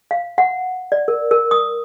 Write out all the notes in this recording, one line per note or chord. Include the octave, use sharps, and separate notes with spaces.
F5
F#5
D5
A#4
A#4
D#6